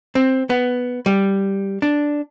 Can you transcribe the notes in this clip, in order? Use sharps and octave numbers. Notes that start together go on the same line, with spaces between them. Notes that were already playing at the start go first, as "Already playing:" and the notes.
C4
B3
G3
D4